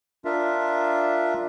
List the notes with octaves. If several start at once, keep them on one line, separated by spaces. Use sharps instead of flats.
D4 F4 A#4 E5